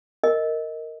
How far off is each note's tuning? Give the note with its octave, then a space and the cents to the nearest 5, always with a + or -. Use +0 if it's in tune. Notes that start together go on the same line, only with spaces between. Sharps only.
A#4 -10 D#5 +15